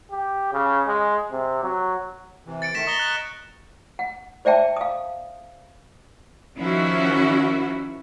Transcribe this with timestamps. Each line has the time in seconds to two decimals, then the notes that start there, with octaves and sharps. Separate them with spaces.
0.11 G4
0.53 C#3
0.87 G#3
1.32 C3
1.63 F#3
2.46 C3 E3
2.62 A6 C#7 D7
2.74 D#3 A3 A#6 B6 E7
2.87 D#5 A#5 C#6 D#6 G7
2.99 F#6
3.99 F#5
4.45 C5 D5 E5 G5 A5
4.77 F5 D#6
6.58 D#3 F3 C#4 E4 F#4